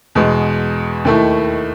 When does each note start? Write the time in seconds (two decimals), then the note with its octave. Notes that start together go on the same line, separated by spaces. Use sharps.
0.15 E2 B2 G#3
1.05 D#2 D#3 A3 E4